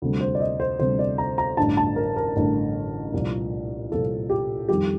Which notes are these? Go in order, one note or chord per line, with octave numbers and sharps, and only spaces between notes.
D2 C3 G3
C5
D5
D#5
C5
D2 C3 G3 C5
D5
A#5
A#5
A1 G2 D3 A5
A5
A#4
A#4
A1 G2 D3
C2 A#2 F3
C2 A#2 F3 A4
G4
F2 D#3 G3 G4